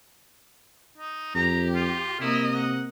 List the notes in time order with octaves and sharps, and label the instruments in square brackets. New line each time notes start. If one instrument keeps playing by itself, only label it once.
[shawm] D#4
[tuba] F2 [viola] G4 [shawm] A#5
[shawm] F4
[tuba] C3 [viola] A#3 D#5 [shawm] E4
[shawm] F#5